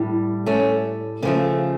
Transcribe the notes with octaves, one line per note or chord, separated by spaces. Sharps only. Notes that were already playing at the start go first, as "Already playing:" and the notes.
Already playing: A2 G3
A3 C#4
C#3 F3 A3 A#3